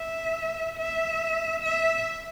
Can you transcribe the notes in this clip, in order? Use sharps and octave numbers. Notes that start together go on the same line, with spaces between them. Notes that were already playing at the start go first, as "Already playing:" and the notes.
Already playing: E5
E5
E5